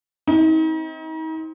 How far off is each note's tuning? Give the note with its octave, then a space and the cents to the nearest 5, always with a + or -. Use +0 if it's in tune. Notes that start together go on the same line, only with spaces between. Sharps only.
C4 +10 D#4 +40 C5 +5